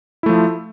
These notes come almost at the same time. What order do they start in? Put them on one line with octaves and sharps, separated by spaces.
E4 A3 F3